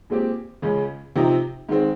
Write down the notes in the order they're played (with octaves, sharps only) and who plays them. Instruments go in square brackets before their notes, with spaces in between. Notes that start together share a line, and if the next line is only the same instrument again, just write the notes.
[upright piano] A#2 G#3 C4 G4
C#2 C#3 G#3 C#4
C3 F3 C4 D#4
G#2 D#3 G#3 C4